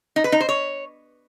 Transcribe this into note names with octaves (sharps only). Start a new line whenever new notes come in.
D#4
B4
D#4
C5
C#5